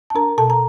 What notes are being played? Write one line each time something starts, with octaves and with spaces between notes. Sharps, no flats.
A5
D4 A#4 A#5
B2 A4 A5
A#5